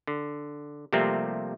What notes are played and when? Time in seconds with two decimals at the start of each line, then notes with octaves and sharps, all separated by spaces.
0.07 D3
0.93 C3 F3 G3 A3 A#3 C4